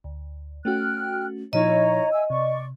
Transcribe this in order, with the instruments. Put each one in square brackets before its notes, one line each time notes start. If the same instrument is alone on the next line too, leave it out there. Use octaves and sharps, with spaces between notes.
[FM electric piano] D2
[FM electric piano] A3 C#4 F#4 [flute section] G5 F6 F#6
[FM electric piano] A#2 F3 D#4 [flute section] E4 C#5 A#5 [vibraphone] D#5
[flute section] E5 G#5 E6
[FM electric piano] C3 [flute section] D5 C#6